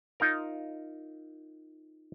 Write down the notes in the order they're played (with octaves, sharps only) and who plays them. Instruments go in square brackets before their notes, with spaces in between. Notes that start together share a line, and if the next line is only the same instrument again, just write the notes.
[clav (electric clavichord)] D#4 F4 A#4